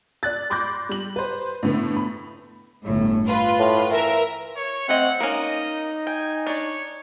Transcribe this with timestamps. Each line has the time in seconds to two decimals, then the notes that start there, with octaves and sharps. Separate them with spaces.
0.23 D5 F#6 A6
0.50 B5 C6 D6 F#6 G6 A#6
0.89 G3 F#7
1.16 B4 C5
1.63 A2 D3 B3
1.96 B5
2.82 G1 A2
3.26 F4 B4
3.59 A2
3.91 E3 A#4 E5
4.56 C#5
4.89 A3 C4 D#5 F#5
5.20 A#3 C#4 D#4 D#5
6.07 G5 G#5
6.47 D4 C#5 D5